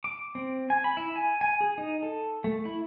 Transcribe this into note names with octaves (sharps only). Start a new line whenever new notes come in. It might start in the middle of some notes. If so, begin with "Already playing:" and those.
D6
C4
G#5
B5
E4
G#5
G#5
G#4
D#4
A4
A3
E4